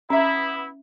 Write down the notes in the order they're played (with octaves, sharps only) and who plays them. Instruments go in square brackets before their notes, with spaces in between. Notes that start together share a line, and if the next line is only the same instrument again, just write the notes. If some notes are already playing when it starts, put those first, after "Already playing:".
[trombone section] B3 E4 [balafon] C#4 E5